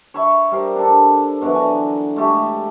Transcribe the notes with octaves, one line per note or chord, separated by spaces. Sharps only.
C#5 E5 B5 C#6
G3 A#4 C5
D4 A4
B2 D3 E3 F#3
G#5 A#5
G#3 A3 G4